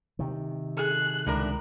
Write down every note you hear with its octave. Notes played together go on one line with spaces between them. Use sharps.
C3 D#3
G#4 A4 F#6
C#2 A2 D4 A#4